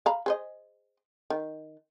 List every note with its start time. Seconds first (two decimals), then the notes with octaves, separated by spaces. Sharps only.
0.06 F5 A#5 B5
0.26 G#4 C5 D#5
1.30 D#3